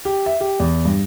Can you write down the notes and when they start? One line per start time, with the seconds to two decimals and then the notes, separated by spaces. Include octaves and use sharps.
0.05 G4
0.26 E5
0.41 G4
0.60 E2
0.85 G2